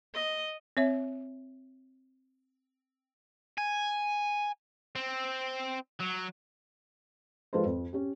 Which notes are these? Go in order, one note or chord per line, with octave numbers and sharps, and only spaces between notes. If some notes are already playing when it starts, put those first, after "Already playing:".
D#5
C4 C#5 E5
G#5
C4
F#3
F3 G#3 F4 A4 B4 C5
F2
C#4 G4